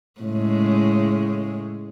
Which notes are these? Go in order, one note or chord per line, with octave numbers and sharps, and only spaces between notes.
A2 C#3 G#3